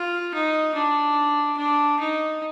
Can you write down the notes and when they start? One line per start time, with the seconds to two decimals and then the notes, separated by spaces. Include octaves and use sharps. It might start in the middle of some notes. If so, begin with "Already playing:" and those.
Already playing: F4
0.34 D#4
0.74 D4
1.57 D4
1.99 D#4